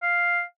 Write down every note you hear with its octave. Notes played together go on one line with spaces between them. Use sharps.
F5